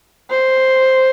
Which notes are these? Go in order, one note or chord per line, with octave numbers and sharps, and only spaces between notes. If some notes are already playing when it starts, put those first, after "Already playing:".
C5